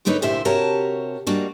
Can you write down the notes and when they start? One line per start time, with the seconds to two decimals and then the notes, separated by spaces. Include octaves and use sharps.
0.05 D3 A3 A#3 D#4 B4 C#5
0.22 D2 A#2 E4 G4 C5 E5
0.45 C3 F#4 G4 A#4 C#5 A5
1.27 G3 G#3 A#3 D4 F#4